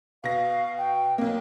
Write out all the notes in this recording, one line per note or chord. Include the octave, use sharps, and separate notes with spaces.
B2 F5 A#6
G5
B1 A#3